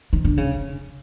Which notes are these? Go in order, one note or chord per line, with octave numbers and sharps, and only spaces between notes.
D#3
D3
C#3